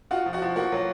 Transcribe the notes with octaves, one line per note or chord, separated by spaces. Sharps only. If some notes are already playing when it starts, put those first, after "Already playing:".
F4 F#4 F#5
F3
F#4 F#5
F3
A#3 F#4 F#5
F#3